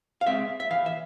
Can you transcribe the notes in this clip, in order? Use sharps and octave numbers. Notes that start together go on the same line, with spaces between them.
F5
G#3 C4 E5
E5
E3 F5
E5